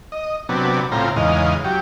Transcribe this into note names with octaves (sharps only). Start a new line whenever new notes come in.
D#5
C3 F#3 B3 D4
A2 C#3 C4 F4 A#5
E2 G#2 C#3 D#5 F5
F#3 G4